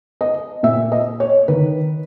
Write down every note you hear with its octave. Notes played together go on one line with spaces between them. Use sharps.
D#5
A#2 E5
D#5
C#5
D#3 B4